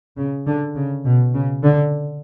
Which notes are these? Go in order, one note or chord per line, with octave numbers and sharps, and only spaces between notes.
C#3
D3
C#3
B2
C#3
D3